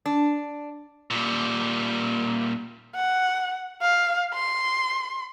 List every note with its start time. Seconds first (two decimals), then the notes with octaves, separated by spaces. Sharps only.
0.06 D4
1.10 A#2 G3
2.95 F#5
3.82 F5
4.34 C6